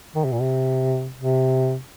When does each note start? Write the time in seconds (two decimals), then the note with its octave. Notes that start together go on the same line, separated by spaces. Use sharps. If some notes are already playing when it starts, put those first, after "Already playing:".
0.15 D#3
0.24 C3
0.32 A#2
0.41 C3
1.16 C3